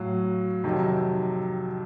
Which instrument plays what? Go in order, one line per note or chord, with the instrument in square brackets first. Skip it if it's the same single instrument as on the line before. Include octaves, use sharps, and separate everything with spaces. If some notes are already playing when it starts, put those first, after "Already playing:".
Already playing: [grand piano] A2 F#3 F5
F2 C3 D#3 F#3